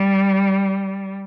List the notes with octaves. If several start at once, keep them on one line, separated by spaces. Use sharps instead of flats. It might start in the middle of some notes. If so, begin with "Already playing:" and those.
Already playing: G3